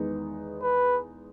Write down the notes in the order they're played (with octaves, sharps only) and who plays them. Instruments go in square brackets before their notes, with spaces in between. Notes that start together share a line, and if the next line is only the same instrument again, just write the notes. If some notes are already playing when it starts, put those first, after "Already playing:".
Already playing: [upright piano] E2 D#3 G#3 B3 D#4
[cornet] B4